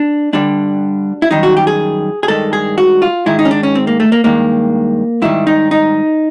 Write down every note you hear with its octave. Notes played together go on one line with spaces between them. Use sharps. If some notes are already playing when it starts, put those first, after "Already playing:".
Already playing: D4
G2 D3 G3 D4
E4
F#2 D#3 G3 D#4
F#4
G4
G#4
G#4
G2 D#3 G#3 A4
G#4
F#4
F4
G#2 D#3 G#3 E4
D#4
C#4
D4
C#4
C4
A#3
A3
A#3
G2 D#3 G#3 A#3
G#2 D#3 G3 E4
D#4
D#4